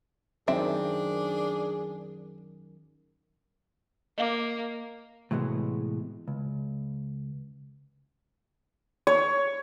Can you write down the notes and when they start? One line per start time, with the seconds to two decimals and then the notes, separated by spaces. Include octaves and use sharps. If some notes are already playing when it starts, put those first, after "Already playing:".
0.48 F#2 D#3 C4 D4 G#4 E5
4.18 A#3 D#5 F5 D6
5.31 A2 C3 E3 G#3 B3 F#4
6.28 C#2
9.07 C#5